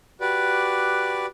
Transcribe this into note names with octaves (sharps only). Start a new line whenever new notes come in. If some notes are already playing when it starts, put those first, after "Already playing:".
F#4 G4 B4 D5